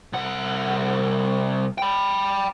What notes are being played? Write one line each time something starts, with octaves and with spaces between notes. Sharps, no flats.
C2 F#5
G5 B5